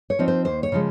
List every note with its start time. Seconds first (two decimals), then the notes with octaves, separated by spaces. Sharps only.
0.10 C#5
0.19 F3 C4 D#4
0.28 C5
0.45 D#2 C5
0.63 C#5
0.72 C#3 F3 G#3